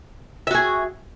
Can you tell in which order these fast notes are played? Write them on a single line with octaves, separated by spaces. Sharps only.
E5 F#4 G#4